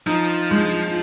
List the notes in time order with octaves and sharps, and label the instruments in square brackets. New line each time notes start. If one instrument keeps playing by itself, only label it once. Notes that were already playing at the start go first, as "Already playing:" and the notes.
[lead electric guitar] F3 [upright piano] D#4
[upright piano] G#3